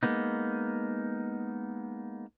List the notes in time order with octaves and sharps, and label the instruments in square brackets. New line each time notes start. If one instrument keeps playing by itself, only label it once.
[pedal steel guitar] G#3 A#3 B3 D#4